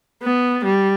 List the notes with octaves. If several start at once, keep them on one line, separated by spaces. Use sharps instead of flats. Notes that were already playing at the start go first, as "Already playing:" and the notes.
B3
G3